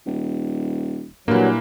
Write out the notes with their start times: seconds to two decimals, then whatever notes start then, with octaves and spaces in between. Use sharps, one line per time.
0.06 D#1
1.28 G2 A#2 E3 F#3 A#3